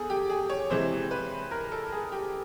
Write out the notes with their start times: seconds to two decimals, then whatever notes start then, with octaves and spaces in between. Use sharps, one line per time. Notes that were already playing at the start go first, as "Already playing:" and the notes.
Already playing: E2 G#4 A4
0.10 G4
0.30 G#4
0.49 C#5
0.70 C3 E3 G#3 C5
1.11 B4
1.51 A#4
1.72 A4
1.92 G#4
2.12 G4